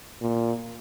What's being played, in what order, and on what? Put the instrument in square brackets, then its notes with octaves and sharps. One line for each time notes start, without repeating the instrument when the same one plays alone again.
[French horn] A#2